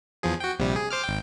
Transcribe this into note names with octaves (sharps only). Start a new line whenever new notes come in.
E2 F3 G#4
F#4 G5
A#1 C3 G3
G#4
C5 D6 F6
G#1 G5